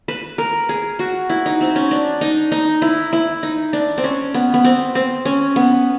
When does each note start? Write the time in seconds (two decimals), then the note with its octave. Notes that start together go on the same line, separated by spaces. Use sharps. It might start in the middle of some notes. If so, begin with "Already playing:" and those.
0.08 B4
0.38 A#4
0.69 G#4
0.99 F#4
1.30 E4
1.46 D#4
1.61 C4
1.76 C#4
1.91 D4
2.21 D#4
2.52 D#4
2.82 E4
3.13 E4
3.43 D#4
3.73 D4
3.98 C4
4.04 C#4
4.34 B3
4.54 B3
4.64 C4
4.95 C4
5.25 C#4
5.56 B3